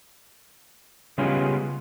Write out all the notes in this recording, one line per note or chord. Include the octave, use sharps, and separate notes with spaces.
C#3 G3 G#3 B3 C#4 F4